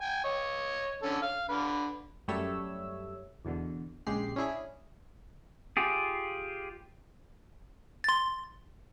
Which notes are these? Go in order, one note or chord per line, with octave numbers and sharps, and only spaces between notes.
G5 G#5
C#5 D#5
D3 C#4 A4
F5
D3 B4
F#2 G3 A3 C#5 E5 E6
E2 B2 D3
A#1 C#3 G#3 G4 C7
C#4 D4 E4 G#4
F4 G4 G#4
C6 A6